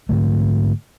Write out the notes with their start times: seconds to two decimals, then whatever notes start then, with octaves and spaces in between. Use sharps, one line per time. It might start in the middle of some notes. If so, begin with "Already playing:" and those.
0.09 G#2 D3 A3